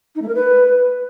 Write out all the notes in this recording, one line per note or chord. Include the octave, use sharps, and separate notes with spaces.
D#4
A3
A#4
B4